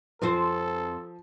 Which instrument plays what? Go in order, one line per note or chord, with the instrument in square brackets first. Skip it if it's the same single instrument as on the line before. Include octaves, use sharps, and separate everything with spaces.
[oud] F2 C4 C5 [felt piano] F3 [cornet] A4